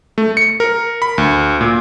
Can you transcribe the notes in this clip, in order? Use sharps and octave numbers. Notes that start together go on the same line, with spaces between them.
A3
C#7
A#4
B5
D2
A#2